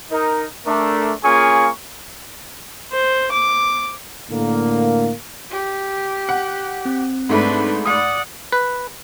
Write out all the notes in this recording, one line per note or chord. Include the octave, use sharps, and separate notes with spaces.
D#4 A#4
A3 D4 A#4
A#3 C#4 F4 G#4 G#5 C#6
C5
D6
A2 D3 A#3
G4
F#5
C4
G#2 A3 D4 B4 B5
D5 F#5 D#6
B4